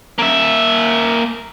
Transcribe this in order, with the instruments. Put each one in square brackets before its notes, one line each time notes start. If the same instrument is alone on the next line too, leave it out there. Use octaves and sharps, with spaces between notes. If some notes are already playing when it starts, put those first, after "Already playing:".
[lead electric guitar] A#3 E5